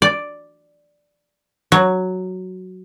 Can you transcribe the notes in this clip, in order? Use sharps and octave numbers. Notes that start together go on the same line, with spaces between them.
D5
F#3